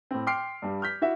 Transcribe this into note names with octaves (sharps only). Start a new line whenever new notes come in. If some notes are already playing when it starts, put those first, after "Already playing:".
A2 C4
G5 C6 D6 F6 C7 D7
G2 G3
F6 G6 B6
E4 F#4 E5